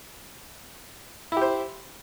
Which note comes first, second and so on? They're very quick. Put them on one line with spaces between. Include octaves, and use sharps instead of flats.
E4 G4 C5